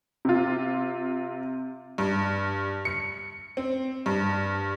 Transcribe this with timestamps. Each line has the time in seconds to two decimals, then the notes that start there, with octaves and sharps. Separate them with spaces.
0.25 C3 F4
1.98 G2
2.85 C#7
3.57 C4
4.06 G2